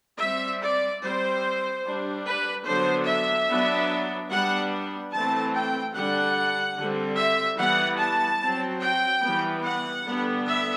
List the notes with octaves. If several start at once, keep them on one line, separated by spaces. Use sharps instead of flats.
G3 C4 E5
D5
G3 C4 C5
G3 D4
B4
D3 F#3 B3 D4 C5
E5
F#3 B3 D4
G3 B3 D4 F#5
E3 A3 C4 A5
G5
D3 G3 D4 F#5
D3 G3 C4
E5
E3 G3 B3 F#5
A5
F#3 C4
G5
E3 G3 B3
F#5
D3 G3 B3 D4
E5